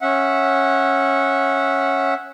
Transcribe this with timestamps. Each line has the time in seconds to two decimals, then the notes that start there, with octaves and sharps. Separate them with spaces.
0.01 C#4 E5 F#5